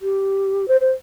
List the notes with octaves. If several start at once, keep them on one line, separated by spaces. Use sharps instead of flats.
G4
C5
C5